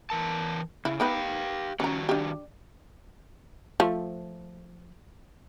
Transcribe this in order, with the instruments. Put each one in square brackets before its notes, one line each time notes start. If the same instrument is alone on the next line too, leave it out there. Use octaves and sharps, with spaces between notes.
[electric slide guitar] E3 A#4 A5
[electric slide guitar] C#3 [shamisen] E4
[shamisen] B3 D#4 B4 [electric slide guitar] G4 F5 G5
[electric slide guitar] D#3 G3 F#4 [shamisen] C#4 A#5
[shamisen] D4 G4
F3 A3